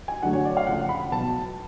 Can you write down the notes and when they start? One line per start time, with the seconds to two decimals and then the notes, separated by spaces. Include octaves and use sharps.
0.08 G#5
0.23 D3 F#3 A3 F#5
0.33 C#5
0.45 D5
0.57 F5
0.67 C#3 F3 A3 F#5
0.89 B5
1.12 B2 F#3 B3 A5